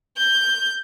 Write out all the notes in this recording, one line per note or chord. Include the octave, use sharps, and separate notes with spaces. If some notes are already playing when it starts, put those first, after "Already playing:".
G6